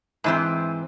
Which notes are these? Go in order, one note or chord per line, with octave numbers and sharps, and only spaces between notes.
G#2 E3 C4